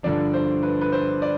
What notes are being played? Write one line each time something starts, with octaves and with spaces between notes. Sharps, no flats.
G2 D3 F3 D4 D5
C5
B4
B4
C5
D5